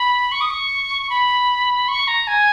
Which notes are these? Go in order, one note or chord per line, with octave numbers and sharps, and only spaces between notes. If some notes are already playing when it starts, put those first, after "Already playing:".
Already playing: B5
C#6
D#6
C#6
B5
C#6
A#5
G#5